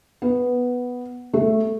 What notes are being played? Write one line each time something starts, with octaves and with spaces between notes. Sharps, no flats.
B3
A3